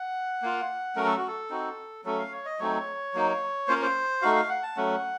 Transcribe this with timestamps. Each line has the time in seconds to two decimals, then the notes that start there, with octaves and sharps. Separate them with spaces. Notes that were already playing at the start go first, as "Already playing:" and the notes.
Already playing: F#5
0.42 A#3 F4
0.96 F#3 A3 C#4 F#4 A#4
1.06 A4
1.17 F#4
1.28 A4
1.50 C4 D#4 F#4
2.05 F#3 A3 C#4 A4
2.19 F5
2.32 C#5
2.46 D#5
2.59 F#3 A3 C4 D#4 C#5
3.14 F#3 A#3 D#4
3.68 A#3 C#4 F4 C5
3.76 A#4
3.82 C5
4.22 A3 D#4 F#4 F5
4.36 F5
4.49 F#5
4.63 A5
4.77 F#3 A3 C#4 F#5